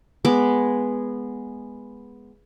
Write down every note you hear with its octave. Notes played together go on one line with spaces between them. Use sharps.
G#3 B3 D6